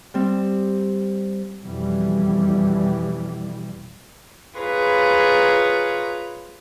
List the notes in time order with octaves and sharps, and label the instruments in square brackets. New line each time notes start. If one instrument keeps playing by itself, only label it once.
[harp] G3 C4
[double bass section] F2 B2 E3 G3
[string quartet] F4 G#4 B4 C#5 A#5